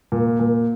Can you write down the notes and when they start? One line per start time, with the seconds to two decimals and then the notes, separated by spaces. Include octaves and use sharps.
0.12 A#2
0.39 A#2